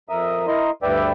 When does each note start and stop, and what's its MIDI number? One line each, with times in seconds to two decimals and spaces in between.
0.09 0.47 41
0.09 0.47 70
0.09 0.47 76
0.09 0.47 87
0.47 0.71 64
0.47 0.71 70
0.47 0.71 75
0.47 0.71 84
0.83 1.12 38
0.83 1.12 43
0.83 1.12 71
0.83 1.12 74
0.83 1.12 76
0.83 1.12 79